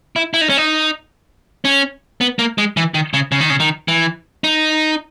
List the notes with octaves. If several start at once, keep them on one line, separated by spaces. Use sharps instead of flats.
E4
E4
D#4
C#4
D#4
C#4
B3
A#3
G#3
E3
D#3
C#3
C#3
D#3
C#3
D#3
E3
D#4